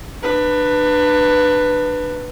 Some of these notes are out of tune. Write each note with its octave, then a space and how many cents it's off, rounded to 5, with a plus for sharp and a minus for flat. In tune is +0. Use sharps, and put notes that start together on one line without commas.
D4 +35 B4 +0